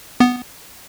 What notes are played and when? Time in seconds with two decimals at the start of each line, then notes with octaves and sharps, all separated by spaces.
0.20 B3